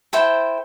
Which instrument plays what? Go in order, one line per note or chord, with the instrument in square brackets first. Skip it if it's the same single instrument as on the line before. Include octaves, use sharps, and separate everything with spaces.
[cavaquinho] E4 A4 C5 G5